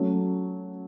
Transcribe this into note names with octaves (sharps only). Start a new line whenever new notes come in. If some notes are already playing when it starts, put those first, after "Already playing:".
Already playing: F#3 A3 C#4